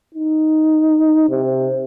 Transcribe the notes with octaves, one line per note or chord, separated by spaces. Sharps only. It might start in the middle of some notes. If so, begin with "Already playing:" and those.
D#4
C3